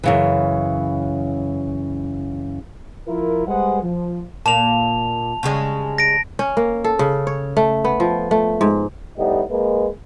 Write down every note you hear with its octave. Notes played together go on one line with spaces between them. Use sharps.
F#2 C#3 E3
F3 E4 F4 A#4
G3 G#3 G#4 B4 C5 F#5
F3
A#2 A#3 A5 F7
C#3 G3 G#3
A#6 D7
C#4
A#3
A4
C#3
C#5
A3
B3
F3
A3
G#2
A2 G3 B3 D#4
G#3 A#3 B4